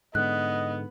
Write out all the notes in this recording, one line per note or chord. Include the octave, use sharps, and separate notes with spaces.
G#2 D3 B3 D#5 F#6